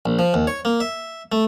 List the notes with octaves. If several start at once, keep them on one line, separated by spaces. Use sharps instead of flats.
A#1
F3
D#2
C#5
A#3
E5
A3